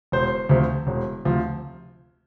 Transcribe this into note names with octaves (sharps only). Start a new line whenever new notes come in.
E1 C5
D2 C3 F3
E1
D2 C3 F3